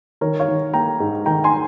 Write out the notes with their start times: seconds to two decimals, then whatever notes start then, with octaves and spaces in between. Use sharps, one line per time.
0.21 D#3 A#4 C#5
0.39 C#5 F5
0.48 D#3
0.74 A#3 G5 A#5
1.00 G#2
1.26 D#3 G5 A#5
1.44 G#5 C6